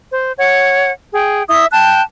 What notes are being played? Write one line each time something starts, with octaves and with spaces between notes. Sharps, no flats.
C5
C#5 F#5
G#4 G5
E4 E5 D#6
G5 A5 F#6